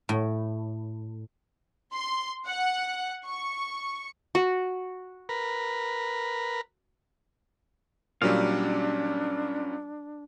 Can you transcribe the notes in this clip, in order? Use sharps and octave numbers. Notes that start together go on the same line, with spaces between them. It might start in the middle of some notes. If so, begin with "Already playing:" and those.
A2
C6
F#5
C#6
F#4
A#4 B4
A#2 F#3 G3 C#4 D4 F5